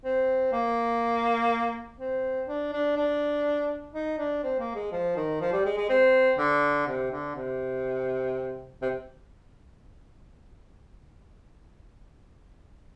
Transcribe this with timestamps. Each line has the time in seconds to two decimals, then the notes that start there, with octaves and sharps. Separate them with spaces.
0.05 C4
0.52 A#3
1.99 C4
2.48 D4
2.73 D4
2.97 D4
3.94 D#4
4.19 D4
4.44 C4
4.59 A#3
4.75 G#3
4.92 F3
5.16 D#3
5.41 F3
5.52 G3
5.65 G#3
5.77 G#3
5.89 C4
6.38 D3
6.87 C3
7.11 D3
7.35 C3
8.82 C3